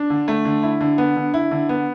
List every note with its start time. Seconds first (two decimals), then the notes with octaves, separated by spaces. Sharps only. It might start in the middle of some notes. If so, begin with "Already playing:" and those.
Already playing: D4
0.10 D3
0.28 A3
0.45 D3
0.63 E4
0.81 D3
0.98 B3
1.16 D3
1.34 E4
1.51 D3
1.69 B3